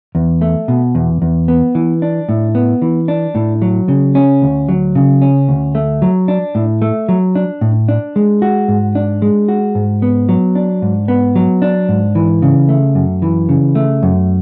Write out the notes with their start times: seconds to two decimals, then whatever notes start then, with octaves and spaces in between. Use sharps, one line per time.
0.15 E2
0.42 A3
0.68 B2
0.95 E2
1.22 E2
1.48 B3
1.75 E3
2.02 D4
2.29 A2
2.55 B3
2.82 E3
3.08 D4
3.35 A2
3.62 F#3
3.88 C#3
4.15 C#4
4.42 D2
4.69 F#3
4.95 C#3
5.22 C#4
5.49 D2
5.75 A3
6.02 F#3
6.28 D4
6.55 A2
6.82 A3
7.09 F#3
7.35 D4
7.61 A2
7.88 D4
8.16 G#3
8.42 F#4
8.68 G#2
8.95 D4
9.22 G#3
9.48 F#4
9.75 G#2
10.02 B3
10.29 F#3
10.55 D4
10.82 G#2
11.08 B3
11.36 F#3
11.62 D4
11.89 G#2
12.15 E3
12.42 C#3
12.69 A3
12.95 F#2
13.22 E3
13.49 C#3
13.75 A3
14.03 F#2